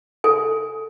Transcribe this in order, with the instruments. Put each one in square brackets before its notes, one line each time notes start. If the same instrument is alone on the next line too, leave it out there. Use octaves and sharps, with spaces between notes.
[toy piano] A4 G#5